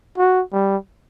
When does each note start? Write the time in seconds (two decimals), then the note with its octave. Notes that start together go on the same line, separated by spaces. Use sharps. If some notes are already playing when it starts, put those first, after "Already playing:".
0.18 F#4
0.52 G3